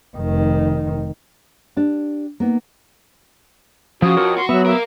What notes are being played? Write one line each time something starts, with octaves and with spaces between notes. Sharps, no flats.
F1 D#3
D4 G4
A#3 B3 D#4
C#3 F3 F#4 D#6
F2 F4 A#4 C#5
F#4 C6
F#3 B3 E5
A#3 A#4 E5